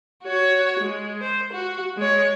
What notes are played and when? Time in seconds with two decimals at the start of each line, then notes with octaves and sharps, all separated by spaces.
0.24 F#4 C#5
0.80 G#3
1.22 C5
1.53 F#4
1.97 G#3 C#5